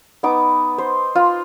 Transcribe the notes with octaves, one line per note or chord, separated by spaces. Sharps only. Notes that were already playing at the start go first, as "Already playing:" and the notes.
B3 D#4 D6
C5
F4